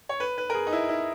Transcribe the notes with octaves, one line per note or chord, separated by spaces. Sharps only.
C#5
B4
B4
A#4
G#4
D#4
E4
E4